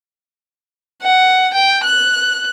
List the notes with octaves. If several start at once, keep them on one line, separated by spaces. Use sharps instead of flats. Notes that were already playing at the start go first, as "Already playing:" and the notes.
F#5
G5
F#6